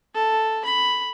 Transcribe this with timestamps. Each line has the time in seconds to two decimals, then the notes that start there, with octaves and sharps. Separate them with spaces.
0.14 A4
0.65 B5